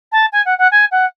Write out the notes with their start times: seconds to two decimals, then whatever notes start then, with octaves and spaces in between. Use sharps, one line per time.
0.11 A5
0.32 G#5
0.45 F#5
0.58 F#5
0.71 G#5
0.91 F#5